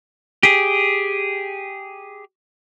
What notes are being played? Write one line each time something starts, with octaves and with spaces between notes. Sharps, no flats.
G4 G#4